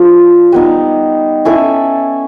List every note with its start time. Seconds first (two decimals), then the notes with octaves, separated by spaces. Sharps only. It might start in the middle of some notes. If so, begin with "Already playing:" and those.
Already playing: F3 D4
0.52 G3 B3 D#4
1.45 C#4 E4 A4